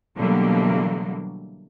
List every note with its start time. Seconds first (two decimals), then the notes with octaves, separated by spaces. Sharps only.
0.16 B2 D3 E3 F#3 G3 A#3